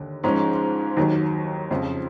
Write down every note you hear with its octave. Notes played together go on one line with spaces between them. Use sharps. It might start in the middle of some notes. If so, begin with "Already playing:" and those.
Already playing: D#2 D3
G#2 F3 G#3 C#4
D#2 D#3 F#3
F2 C#3 F3